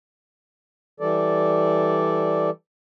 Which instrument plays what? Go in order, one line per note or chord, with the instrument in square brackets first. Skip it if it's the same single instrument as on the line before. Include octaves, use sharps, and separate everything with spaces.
[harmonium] E3 G3 A4 D5